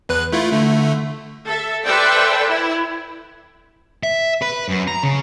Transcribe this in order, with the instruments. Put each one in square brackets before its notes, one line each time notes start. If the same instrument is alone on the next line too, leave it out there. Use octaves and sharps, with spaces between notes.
[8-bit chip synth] E2 B4 F#6
A3 E4 F4
D3 A3
[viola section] A4 E5
A4 B4 C5 D5 E5 G5
E4
[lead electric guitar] E5
B4
F#2
A#5
C#3